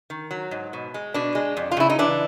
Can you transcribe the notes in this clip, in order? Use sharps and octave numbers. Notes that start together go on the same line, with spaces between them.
D#3
F#3
G#2
B2
G#3
B2 D4
G#3
F2
F4
C#3 E4
D#4
E3 D4